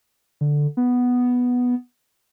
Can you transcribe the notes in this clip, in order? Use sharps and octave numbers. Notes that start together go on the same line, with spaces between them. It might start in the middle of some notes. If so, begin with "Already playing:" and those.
D3
B3